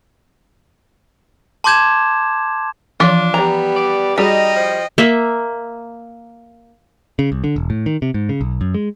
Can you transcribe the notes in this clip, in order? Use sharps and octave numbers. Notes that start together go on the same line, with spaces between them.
A5 C6 D6 G6 G#6 E7
E3 F3 D4 F4
G3 B3 A#5
D5
G3 D#4 F#4 G#4 D5 D#5 G5
F3
A#3 E5
C#3
C2
D3
E1
A2
D#3
C3
G#2
C#3
B1
F#2
G#3